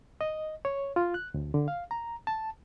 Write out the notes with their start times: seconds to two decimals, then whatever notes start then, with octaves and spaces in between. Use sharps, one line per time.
0.21 D#5
0.65 C#5
0.96 F4
1.14 F#6
1.34 D2
1.54 D3
1.68 F5
1.91 A#5
2.27 A5